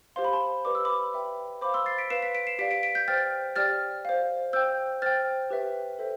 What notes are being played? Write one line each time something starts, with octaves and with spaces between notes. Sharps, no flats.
G4 C5 F5 C6
B5
A5 C6
G4 B4 D5 D6
E6
B5 D6
B4 E5 G5
C5 F5 B5 D6
C6 E6
A6 C7
B6 D7
B4 F5 C7 E7
B6 D7
B6 D7
C7 E7
G4 D5 F5 B6 D7
B6 D7
B6 D7
G6 B6
C5 G5 F6 A6
G4 D5 G5 F6 A6
C5 F5
C5 G5 E6 G6
C5 G5 F6 A6
G4 B4 E5 G5
A4 C5 E5 G5